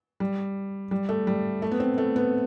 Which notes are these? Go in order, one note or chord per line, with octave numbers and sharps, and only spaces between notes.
G3
G3
A3
G3
A3
B3
C4
A3
B3